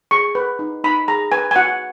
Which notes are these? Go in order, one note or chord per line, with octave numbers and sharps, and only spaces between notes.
G#4 C#6
B4
D#4
D#4 B5
G#4 A#5
B4 G#5
G#5
F#4 F#5